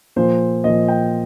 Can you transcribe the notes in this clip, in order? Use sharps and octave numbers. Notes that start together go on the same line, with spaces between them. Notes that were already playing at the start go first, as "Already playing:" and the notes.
A#2 F3 C5
A#2 F3 D#5
G5